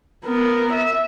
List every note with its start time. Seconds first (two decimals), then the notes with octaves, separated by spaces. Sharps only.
0.25 B3 A#4
0.73 E5